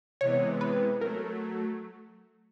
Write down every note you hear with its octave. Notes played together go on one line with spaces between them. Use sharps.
C3 E3 G#3 B3 C#5
B4
F#3 A3 A#4